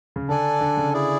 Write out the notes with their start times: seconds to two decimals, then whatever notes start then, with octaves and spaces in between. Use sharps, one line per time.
0.16 C#3
0.28 D3 D4 A4 D5 G#5
0.61 D3
0.77 C#3
0.93 E4 G#4 D5